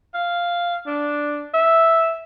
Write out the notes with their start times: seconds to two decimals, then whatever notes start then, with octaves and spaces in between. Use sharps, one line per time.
0.14 F5
0.87 D4
1.54 E5